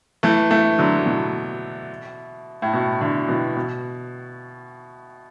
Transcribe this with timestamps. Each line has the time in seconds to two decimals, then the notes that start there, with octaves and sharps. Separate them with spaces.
0.23 E3 A3
0.51 E3 A3
0.79 D3 F#3
0.96 F#3
1.06 B2 E3
2.62 A2
2.73 B2
3.01 A2 D3
3.28 B2 E3
3.57 B2